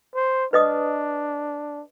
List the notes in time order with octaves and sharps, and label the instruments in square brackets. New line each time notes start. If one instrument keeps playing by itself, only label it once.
[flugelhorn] C5
[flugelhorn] D4 [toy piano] B4 D#5 D#6